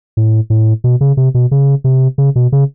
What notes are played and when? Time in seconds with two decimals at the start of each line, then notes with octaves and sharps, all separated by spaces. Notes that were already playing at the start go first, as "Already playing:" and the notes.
0.17 A2
0.50 A2
0.84 B2
1.01 C#3
1.17 C3
1.34 B2
1.51 C#3
1.84 C3
2.18 C#3
2.36 B2
2.52 C#3